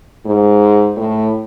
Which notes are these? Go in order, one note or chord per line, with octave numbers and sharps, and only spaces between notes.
G#2
A2